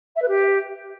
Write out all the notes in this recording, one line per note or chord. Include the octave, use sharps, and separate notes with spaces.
E5
B4
G4